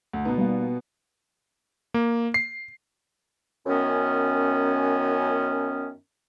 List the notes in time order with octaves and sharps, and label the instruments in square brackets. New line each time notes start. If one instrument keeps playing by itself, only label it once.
[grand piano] D2
[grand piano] B2 B3 [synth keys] D#4
[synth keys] G3 A#3
[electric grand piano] A#3
C7
[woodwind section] F#2 D#3 B3 C#4